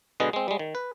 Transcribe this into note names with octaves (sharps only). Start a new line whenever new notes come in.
B2 D3 G#3 B4 D#5
G#3 C4
G3 G#3
D#3
B4